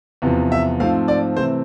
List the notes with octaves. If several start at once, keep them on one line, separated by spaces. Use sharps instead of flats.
E2 C3 F3 B3
E5
G#2 F3 A3 C4 F5
D5
C3 E3 A3 C4 C5